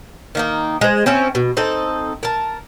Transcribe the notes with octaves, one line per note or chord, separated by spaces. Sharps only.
D#3 A#3 D#4
G#3 C5
C4 C#4 E4
B2
C4 D#4 A4
A#4 A5